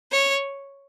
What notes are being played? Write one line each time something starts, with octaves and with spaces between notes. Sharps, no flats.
C#5